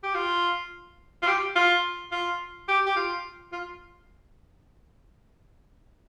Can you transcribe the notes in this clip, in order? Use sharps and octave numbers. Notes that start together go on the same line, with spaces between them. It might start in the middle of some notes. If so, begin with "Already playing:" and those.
G4
F4
F4
G4
F4
F4
G4
G4
F4
F4